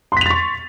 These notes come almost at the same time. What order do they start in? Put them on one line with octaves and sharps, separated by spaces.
C6 B6 F7 A6 C#6